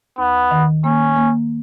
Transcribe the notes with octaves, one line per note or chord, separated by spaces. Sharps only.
D#2 B3
D#3
A#3 C#4
A#3